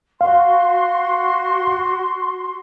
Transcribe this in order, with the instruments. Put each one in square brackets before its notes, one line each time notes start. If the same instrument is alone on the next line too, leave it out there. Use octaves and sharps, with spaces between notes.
[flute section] F#4 C6 [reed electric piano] F5